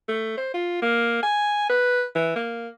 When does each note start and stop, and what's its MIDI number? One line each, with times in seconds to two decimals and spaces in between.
0.08 0.36 57
0.37 0.51 72
0.54 0.78 65
0.82 1.22 58
1.23 1.69 80
1.69 2.04 71
2.16 2.36 52
2.36 2.68 58